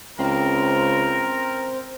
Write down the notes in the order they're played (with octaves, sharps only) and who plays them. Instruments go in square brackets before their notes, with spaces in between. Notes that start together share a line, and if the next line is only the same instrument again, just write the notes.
[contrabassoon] C#2 [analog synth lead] C4 [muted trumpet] A#4